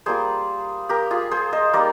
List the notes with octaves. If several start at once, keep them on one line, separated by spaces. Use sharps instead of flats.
G3 A#3 F4 G#4 C5
G4 A#4
F4 G#4
G#4 C5
C5 D#5
G3 A#3 D#4 A#4 D5